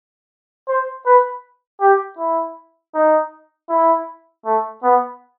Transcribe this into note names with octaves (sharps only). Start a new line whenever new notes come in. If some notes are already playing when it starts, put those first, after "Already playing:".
C5
B4
G4
E4
D#4
E4
A3
B3